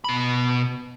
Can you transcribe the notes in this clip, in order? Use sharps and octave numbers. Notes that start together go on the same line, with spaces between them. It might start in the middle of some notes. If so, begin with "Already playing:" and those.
B2 B5